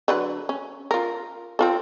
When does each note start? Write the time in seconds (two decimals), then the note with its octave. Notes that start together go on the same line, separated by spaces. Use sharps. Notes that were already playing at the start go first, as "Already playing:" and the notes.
0.08 D3 F#3 B4
0.49 C#4
0.91 F4 A#4
1.59 C4 F4 A4